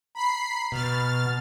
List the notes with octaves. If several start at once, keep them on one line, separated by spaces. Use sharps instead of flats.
A#5 B5 C7
B2 F6 A6